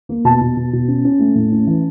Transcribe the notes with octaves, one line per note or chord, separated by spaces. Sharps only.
A#3
B2 A5
B2
B2
B2
C#4
C#4
A3
A2
C#4
E3